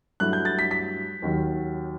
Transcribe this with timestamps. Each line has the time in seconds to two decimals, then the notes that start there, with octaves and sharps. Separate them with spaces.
0.20 G2 F#3 A3 E4 F#6
0.33 G6
0.45 A6
0.59 B6
0.71 B6
1.22 D#2 D#3 F#3